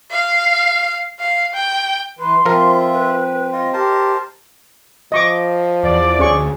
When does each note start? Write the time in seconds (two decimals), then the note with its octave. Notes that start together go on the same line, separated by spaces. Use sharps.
0.11 F5
1.20 F5
1.54 G5
2.19 E3 B4 C6
2.46 F3 C4 F4 A#4 E5
2.91 B4
3.52 F4 D#5
3.73 G4 A#4 C5 A5
5.12 F3 D#5 C#6 D6
5.83 E2 D5
6.19 D2 C#4 G#4 C#6